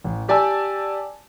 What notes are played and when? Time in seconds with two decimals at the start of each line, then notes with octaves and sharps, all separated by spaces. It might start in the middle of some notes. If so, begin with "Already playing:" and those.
0.04 A1
0.28 G4 D5 G#5 A5 E6